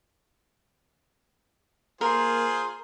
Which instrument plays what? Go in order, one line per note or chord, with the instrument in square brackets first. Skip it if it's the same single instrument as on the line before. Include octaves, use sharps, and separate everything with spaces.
[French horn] A#3 [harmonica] F4 G#4 C5 [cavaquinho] A#4